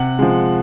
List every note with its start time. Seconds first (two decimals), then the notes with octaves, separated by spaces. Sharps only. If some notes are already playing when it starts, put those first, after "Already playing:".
Already playing: C3 F#5
0.19 F3 G#3